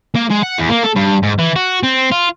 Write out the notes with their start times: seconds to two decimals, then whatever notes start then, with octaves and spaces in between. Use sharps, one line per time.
0.15 A#3
0.30 G#3
0.43 F#5
0.58 E2
0.70 A#3
0.83 A4
0.96 G2
1.23 G#2
1.39 E3
1.56 F#4
1.83 C4
2.12 F4